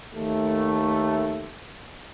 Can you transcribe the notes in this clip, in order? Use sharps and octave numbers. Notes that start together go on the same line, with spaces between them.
D#2 A3